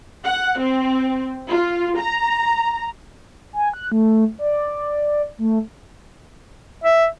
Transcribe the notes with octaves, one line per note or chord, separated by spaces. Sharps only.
F#5
C4
F4
A#5
G#5
F#6
A3
D5
A3
E5